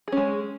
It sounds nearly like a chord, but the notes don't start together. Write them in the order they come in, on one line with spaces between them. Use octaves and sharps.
G#4 C#4 G#3